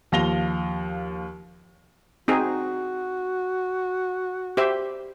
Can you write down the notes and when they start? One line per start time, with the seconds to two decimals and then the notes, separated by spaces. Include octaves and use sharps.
0.12 D#2 F3 F5 A#6 F7 G7
2.28 C4 D#4 F#4 G#4
4.57 G4 C5 E5